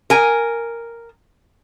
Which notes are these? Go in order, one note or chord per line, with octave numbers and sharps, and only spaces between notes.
A#4 G#5